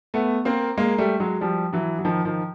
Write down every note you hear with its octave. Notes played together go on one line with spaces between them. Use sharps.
A3 B3
A#3 C4
G#3 A#3
G3 A3
F#3 G#3
F3 G3
E3 F#3
F#3
D#3 F3
D#3 F3